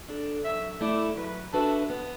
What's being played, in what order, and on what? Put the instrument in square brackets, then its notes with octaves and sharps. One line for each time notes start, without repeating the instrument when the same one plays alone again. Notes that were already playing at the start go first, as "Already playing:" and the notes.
[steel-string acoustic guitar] D4 A4
[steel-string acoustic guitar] F#3 [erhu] E5
[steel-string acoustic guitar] A3 E4 [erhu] D5
[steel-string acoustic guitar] F#3 [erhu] B4
[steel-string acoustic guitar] D4 F#4 B4 E5 [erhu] A4
[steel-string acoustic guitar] B3